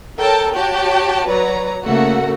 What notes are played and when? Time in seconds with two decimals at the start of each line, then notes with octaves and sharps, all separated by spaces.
0.20 A4 A#4 C#5 G5 A5
0.55 F#4 G4 C#5 G5 A5
1.29 F#3 B4 C#5 D5 A#5
1.84 C#3 A3 A#3 F#4